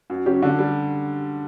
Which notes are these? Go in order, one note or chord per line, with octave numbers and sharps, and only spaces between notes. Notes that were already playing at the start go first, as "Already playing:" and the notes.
F#2
C#3 F#3 C#4 G4
D3
G3